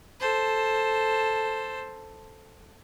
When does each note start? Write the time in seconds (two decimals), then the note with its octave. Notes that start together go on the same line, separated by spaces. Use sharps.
0.20 A4 C5